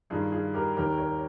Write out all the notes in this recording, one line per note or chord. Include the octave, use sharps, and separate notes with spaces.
G2 D#3 F4 G#4
F4 G#4
G4 A#4
D#2 D#3 G4 A#4
A#4 C#5